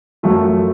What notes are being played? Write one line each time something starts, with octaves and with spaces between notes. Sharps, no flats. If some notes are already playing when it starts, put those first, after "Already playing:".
F#2 F3 A3 F4